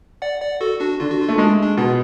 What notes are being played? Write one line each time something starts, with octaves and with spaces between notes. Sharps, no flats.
D5 F#5
D5 F#5
F#4 A4
D4 F#4
D3 F4
F#4
F4
A3
G#3 D4
D4
B2 F4